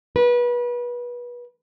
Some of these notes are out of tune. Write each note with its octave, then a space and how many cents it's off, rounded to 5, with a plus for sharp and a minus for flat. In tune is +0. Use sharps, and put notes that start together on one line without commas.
B4 -30